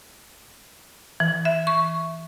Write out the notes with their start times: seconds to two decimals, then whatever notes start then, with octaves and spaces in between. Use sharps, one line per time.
1.20 E3
1.45 E5
1.67 C#6